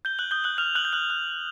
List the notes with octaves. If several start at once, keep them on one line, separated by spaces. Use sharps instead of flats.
G6 G7
F#6 F#7
D#6 G6 G7
F#6 F#7
F6 G6 F7
F#6 F#7
G6
F#6 F#7
F#6